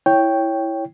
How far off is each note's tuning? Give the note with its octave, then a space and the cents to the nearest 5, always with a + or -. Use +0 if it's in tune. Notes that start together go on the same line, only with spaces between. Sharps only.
E4 +0 C#5 +0 G5 +0